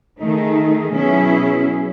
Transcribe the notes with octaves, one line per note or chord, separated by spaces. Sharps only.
D#3 A3 D#4 G#4
B2 F#3 C#4 E4 G#4